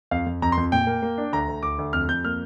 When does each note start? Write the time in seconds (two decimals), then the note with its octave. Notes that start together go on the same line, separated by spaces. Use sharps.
0.11 F2 F5
0.27 F2
0.42 F2 A#5
0.52 C6
0.58 F2
0.72 A#2 G5
0.87 A#3
1.02 A#3
1.18 D4
1.33 D2 A#5
1.48 D2
1.63 D2 D6
1.78 D2
1.93 F2 F6
2.09 F2 G6
2.24 A#3 F6